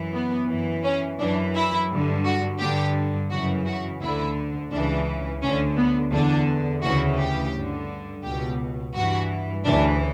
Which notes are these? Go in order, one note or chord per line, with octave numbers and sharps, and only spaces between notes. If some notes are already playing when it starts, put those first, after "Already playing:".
Already playing: F#2 E3
B3
F#2 E3
C#4
F#2 E3 D4
E4
G2 D3
F#4
G2 D3 G4
F#2 C#3 E3 F#4
F#4
D2 D3 E4
C#2 C#3 E3 D4
D2 D3 C#4
B3
E2 D3 D4
D2 C#3 E3 F#4
G4
G2 D3
C#2 B2 G4
G2 E3 F#4
D2 C#3 E3 D4